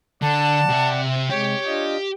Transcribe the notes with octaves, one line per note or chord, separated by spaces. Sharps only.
D3 D5 F#5 A5
C3 E5
C3 G#3 G4 C#5
D4 F4 D#5